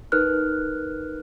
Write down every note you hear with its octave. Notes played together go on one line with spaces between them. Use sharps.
D#4 A#4 B4 F6 F#6